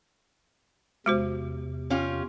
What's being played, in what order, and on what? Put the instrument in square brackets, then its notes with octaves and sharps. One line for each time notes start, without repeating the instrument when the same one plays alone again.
[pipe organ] E2 C3 [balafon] G#3 F#4 C5
[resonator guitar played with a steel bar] C#4 F4 G4